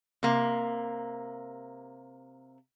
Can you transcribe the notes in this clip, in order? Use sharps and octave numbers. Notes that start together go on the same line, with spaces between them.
C3 A#3